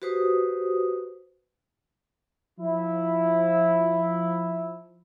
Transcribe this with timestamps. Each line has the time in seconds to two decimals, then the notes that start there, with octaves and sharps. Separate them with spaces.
0.02 F#4 G4 B4 C5 D#6
2.59 F3 E4